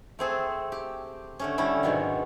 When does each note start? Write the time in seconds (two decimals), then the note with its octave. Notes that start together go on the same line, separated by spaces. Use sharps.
0.19 A3 C4 G#4 A4
0.72 G4
1.39 D3 A3 C#4
1.58 D3 G3 C#4 E4 A4
1.83 G#2 B2 D#3 F#3